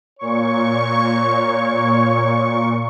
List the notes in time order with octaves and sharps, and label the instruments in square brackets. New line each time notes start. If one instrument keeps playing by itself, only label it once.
[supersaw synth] A#2 C#6 [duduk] C#5